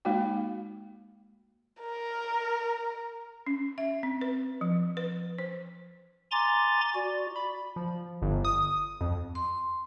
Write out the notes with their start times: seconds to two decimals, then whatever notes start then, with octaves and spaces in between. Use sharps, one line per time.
0.05 G#3 A#3 D#4 F#4 G5
1.80 A#4
3.47 C#4
3.78 E5
4.03 C4
4.21 B4
4.61 F3
4.97 B4
5.38 C5
6.31 G#5 A#5 C6 D6 A6
6.94 F#4 D5
7.36 B5
7.76 F3
8.22 G1
8.45 D#6
9.01 F2
9.35 C6